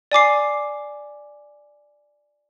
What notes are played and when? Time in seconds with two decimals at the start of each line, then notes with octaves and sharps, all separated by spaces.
0.12 D5 G#5 D6 C7